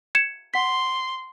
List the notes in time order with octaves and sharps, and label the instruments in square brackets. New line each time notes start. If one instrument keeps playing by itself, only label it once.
[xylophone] G#6 C#7 E7
[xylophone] F#5 B6 [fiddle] C6